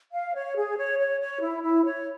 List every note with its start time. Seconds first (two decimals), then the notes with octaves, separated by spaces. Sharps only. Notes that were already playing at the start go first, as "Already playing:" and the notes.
0.12 F5
0.35 C#5
0.55 G#4
0.77 C#5
0.99 C#5
1.20 C#5
1.41 E4
1.63 E4
1.84 C#5